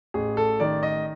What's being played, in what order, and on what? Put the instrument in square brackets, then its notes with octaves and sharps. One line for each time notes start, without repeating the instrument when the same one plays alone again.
[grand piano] A1 G#4
A4
D#3 D5
D#5